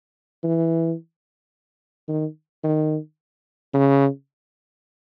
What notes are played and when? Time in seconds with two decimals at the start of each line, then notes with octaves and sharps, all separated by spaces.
0.43 E3
2.08 D#3
2.64 D#3
3.74 C#3